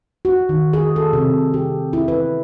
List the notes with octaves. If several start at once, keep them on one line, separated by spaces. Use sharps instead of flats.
F#4
D#3
G#4
A4
C3
G4
E4
B4